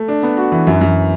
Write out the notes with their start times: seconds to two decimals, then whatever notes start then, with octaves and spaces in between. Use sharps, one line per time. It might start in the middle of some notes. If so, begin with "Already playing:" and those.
Already playing: A3
0.08 D4
0.23 B3
0.37 F#4
0.52 E3
0.67 F#2
0.81 F#2